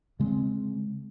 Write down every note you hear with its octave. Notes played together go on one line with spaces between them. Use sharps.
C#3 G#3 C4